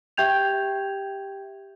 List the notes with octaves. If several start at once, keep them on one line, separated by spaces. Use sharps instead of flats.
G4 E5 G5 G6 G#6 F7